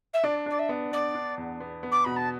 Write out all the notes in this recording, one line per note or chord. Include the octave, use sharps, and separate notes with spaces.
E5
D4 D5
D4 D5
E5
B3
B3 D5
D4
E2
B3
B3
D6
B2 B5
A5